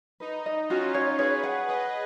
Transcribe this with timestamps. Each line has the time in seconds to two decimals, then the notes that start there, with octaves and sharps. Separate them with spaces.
0.20 D#4 B4
0.46 D#5
0.69 C#4 F4 F#4
0.94 C#5
1.19 G#4 B4 C#5
1.43 F#5
1.68 B4 C#5 D#5